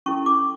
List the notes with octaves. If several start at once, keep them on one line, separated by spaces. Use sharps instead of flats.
C#4 E4 A4 C#6
D6